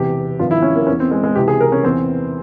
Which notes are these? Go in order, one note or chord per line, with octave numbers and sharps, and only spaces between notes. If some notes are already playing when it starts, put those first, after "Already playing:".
Already playing: E1 E2 C3 G4
G#1 G2 F3 F4
E4
C#4
A#3
E2 E3 C#4
C4
G#3
G#3
C#2 C3 E3 G4
G#4
A#4
C#4
E2 E3 C4